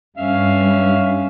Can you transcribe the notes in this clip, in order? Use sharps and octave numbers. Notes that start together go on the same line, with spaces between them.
G2 C#4 E5 F5